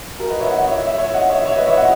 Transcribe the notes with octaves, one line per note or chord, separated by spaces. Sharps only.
F#4 A#4
B4 D#5
C#5 E5
D#5 F#5
D#5
C#5 E5
C#5 E5
C#5 E5
D#5 F#5
C#5 E5
C#5 E5
B4 D#5
C#5 E5
D#5 F#5